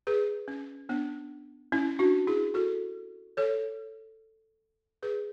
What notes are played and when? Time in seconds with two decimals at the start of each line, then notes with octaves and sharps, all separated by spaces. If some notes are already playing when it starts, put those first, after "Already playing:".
0.07 G#4 B4
0.48 C#4
0.89 B3 D4
1.72 C#4 E4
1.99 D4 F#4
2.27 E4 G#4
2.54 F#4 A4
3.37 A4 C#5
5.03 G#4 B4